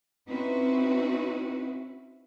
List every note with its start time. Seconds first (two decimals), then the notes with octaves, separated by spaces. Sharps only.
0.27 C4 C#4 D#4 E4 F#4 B4